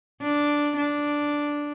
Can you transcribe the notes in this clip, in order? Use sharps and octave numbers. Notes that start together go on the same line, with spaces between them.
D4
D4